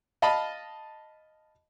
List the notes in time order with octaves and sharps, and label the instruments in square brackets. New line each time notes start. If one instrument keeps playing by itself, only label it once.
[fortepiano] D#5 F5 A5 B5